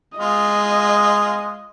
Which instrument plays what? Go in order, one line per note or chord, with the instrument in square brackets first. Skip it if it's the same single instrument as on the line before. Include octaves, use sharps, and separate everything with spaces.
[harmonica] G#3 F4 [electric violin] D#5